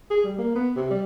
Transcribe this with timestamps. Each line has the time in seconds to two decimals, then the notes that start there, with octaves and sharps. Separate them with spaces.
0.10 G#4
0.24 G3
0.38 A#3
0.55 B3
0.76 C3
0.91 G3